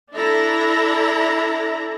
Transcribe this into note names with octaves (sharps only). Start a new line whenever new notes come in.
D4 E4 A4 A#5